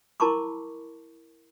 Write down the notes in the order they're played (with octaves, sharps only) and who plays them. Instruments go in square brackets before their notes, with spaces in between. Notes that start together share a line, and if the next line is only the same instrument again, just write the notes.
[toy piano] E4 A#4 A5 B5 C#6 D6